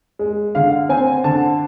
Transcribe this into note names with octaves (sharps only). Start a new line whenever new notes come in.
G#3
D3 F5
C4 G#5
D3 A5